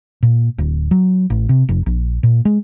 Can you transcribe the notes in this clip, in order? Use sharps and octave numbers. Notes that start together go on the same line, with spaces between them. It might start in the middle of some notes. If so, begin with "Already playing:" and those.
A#2
D1
F#3
A1
C3
F1
A#1
A#2
G#3